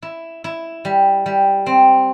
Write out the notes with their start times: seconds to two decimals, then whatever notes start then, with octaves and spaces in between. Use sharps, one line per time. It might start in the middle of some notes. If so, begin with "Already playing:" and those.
0.02 E4
0.44 E4
0.85 G3
1.26 G3
1.66 C4